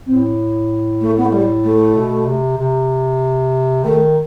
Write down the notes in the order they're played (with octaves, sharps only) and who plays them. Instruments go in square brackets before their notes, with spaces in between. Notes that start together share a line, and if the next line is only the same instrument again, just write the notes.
[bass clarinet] A2 [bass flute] C4
[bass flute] A3
B3
A3
G3
A3
[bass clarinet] B2
C3
C3
[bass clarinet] D#3 [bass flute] A3